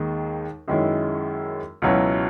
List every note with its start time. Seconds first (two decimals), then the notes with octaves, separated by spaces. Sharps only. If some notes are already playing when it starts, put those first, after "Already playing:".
Already playing: D#2 D#3 G#3 D#4
0.68 F#2 D#3 G#3 C#4 E4
1.82 C#2 B2 F#3 C#4 E4